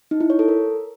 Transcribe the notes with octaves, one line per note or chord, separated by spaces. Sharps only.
D#4
E4
C#5
A4
A#4